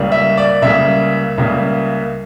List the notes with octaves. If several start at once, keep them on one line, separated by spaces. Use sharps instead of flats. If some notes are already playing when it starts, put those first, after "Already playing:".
Already playing: C#2 C#3 G3 A#3
E5
D5
C#2 C#3 G3 A#3 E5
C#2 C#3 G3 A#3